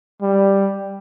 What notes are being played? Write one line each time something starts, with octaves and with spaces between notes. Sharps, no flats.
G3